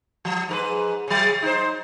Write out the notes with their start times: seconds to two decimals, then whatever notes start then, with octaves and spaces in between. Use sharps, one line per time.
0.25 F3
0.49 G#2 A#4 B4
1.08 C#3 F#3
1.42 D#4 C5